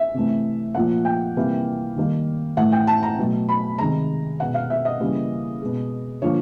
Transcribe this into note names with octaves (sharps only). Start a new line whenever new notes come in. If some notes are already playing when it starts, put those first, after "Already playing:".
Already playing: E5
C3 E3 A3
A#2 F3 A#3 F#5
G5
C3 E3 G3 A#3
D#3 G3 A#3
A2 E3 A3 F#5
G5
A5
A#5
B2 F#3 A3
B5
C3 D#3 G#3 A#5
B2 G#3 F#5
F5
E5
D#5
C#3 E3 G3 A#3
B2 G#3
D3 F3 A#3 C#5